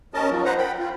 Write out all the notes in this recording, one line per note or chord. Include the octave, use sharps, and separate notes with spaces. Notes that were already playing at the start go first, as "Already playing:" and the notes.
D#2 C#4 A#4 D#5 A5
F3 F#3
B4 C5 F#5 A#5
G5 B5
C4 F4